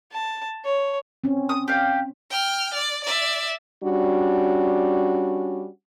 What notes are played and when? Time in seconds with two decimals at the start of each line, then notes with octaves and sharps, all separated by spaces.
0.12 A5
0.64 C#5
1.24 C4 C#4
1.49 D#6
1.68 G4 F5
2.30 G5 F6
2.73 D5
3.04 D5 E5
3.84 G3 C#4 D4 F#4